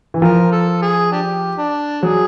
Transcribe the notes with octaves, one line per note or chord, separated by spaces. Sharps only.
E3
F3 A#4
A4
G#4
D4 G4
D4
F#3 G#4